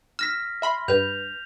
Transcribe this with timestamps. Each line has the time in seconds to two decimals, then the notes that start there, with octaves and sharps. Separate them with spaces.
0.19 E6 F6 A#6 B6
0.62 E5 B5 C6
0.88 G2 B4 G6 F7